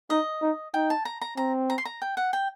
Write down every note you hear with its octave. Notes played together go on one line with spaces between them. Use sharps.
D#4 D#5
D#4
D#4 G5
A5
A#5
A#5
C4 A#5
A#5
C6
A#5
G5
F#5
G5